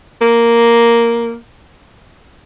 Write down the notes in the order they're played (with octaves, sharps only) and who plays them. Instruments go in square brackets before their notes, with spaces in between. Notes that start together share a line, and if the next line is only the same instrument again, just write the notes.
[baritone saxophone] A#3